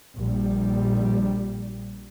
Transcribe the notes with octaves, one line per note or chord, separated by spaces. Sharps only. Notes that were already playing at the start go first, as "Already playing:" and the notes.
A#1 G3